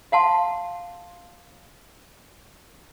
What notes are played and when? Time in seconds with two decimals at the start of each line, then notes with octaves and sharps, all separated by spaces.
0.12 F5 F#5 A5 C6